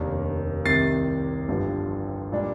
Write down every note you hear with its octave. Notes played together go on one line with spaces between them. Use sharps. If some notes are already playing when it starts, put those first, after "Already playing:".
Already playing: F1 D#2 D#3 A#3 D4
C2 C3 D#3 A6 C7
G1 G2 D3 F3
A#2 G3 D4